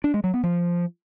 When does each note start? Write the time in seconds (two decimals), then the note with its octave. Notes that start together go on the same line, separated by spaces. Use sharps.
0.04 D4
0.14 G#3
0.24 F#3
0.34 B3
0.43 F3